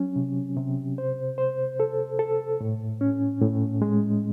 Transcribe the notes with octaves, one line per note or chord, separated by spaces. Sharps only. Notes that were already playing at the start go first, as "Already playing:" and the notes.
Already playing: F#3 C#4
C3
C3
C5
C5
A4
A4
A2
C#4
A2
G#3